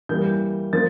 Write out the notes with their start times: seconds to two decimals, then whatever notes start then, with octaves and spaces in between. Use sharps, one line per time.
0.09 E3 G3 A#3 G6
0.73 F3 A#3 A6